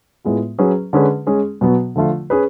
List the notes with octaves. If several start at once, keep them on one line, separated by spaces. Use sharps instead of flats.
A2 G#3 B3 F4
F#3 C#4 G#4 B4
D3 G#3 C#4 G#4 B4
G#3 C#4 G#4
B2 F#3 B3 F#4
D3 F3 A3 F4
C#4 G#4 B4